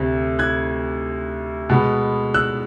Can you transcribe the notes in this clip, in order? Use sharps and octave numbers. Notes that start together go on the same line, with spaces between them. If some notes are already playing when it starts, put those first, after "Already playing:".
Already playing: D2 C3
F#6 G#6
B2 G#3 B3
E6 F#6